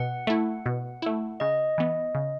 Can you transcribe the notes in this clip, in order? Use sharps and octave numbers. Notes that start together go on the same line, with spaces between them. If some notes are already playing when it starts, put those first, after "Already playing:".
Already playing: B2 F#5
A3 E4
B2
A3 E4
C#3 D#5
E3 B3
C#3